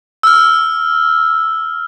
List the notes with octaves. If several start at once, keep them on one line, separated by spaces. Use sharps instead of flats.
E6 F6